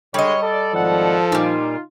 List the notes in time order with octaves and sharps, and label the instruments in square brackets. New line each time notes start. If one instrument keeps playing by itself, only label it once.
[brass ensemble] D3 G#3 [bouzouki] G3 D#5 [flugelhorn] C#5
[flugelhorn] A4 [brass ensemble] D5
[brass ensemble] G#1 D5 F#5 [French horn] F3
[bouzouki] A#2 G3 [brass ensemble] D#4 F4